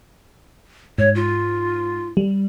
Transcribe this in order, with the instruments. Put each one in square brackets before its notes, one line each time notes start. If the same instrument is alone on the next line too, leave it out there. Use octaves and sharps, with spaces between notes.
[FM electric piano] G#2 [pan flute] C#5
[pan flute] F4
[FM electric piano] G3